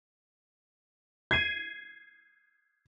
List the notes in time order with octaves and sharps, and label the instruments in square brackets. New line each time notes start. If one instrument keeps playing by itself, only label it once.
[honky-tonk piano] G#6 C7 D#7